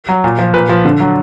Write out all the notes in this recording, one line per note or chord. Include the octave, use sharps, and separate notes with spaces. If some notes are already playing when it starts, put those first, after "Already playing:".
F#3
A#2
F3
A#2 B4
F3
D3
F#3